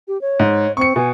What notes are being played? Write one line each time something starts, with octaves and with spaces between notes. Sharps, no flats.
G4
C#5
G#2
C4 C#6 C#7
B2 G#5